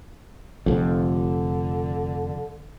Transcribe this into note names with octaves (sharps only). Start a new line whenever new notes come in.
F1 F2 D3